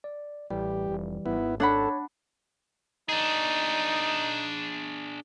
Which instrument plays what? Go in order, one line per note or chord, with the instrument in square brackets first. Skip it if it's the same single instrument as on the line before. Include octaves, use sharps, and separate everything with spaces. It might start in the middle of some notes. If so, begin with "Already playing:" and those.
[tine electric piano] D5
[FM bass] A1 [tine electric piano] E3 G3 [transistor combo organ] G4
[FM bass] F1
[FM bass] G#1 [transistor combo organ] B3 E4
[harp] D4 F#5 B5 [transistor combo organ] A4 [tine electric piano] C#5
[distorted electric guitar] D4 G#4 [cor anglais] D#4